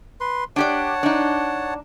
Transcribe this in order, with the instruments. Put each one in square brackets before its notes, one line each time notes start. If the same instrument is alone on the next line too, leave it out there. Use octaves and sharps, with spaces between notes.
[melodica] B4 C6
[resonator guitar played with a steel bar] D4 G4 D5 [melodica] C#5 F#5 A5
[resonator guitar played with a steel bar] D4 D#4